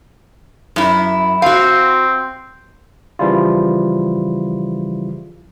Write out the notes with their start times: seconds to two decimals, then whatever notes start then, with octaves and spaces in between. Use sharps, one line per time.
0.76 F#2 E4
1.42 C4 F#4 F5
3.19 C#3 E3 F3 G3 E4 F4